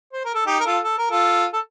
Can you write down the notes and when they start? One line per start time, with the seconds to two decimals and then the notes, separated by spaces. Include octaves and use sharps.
0.13 C5
0.25 A#4
0.35 A4
0.47 D#4 G4
0.60 A#4
0.65 F4 A4
0.84 A4
0.98 A#4
1.11 F4 A4
1.54 A4